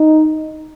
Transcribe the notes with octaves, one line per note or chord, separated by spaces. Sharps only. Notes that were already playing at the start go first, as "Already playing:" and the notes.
Already playing: D#4